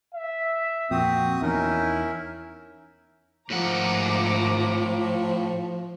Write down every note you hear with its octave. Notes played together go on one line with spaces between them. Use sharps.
E5
F2 A#2 C4 F#4 D#6
E2 C#4 D#4 E4 A#4
G#1 A2 F3 A3 F#5 A#5 D6